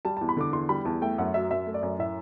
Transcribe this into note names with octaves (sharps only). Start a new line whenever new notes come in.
G3 A5
A5
E2
B5
D3 D6
E2 C6
G3 B5
E2 A5
A3 G5
F#2 F#5
F#3 E5
F#2 E5
A3
D5
F#2
A2 E5